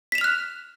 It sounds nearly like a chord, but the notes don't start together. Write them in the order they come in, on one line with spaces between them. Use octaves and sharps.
B6 E7 F7 F6 F#6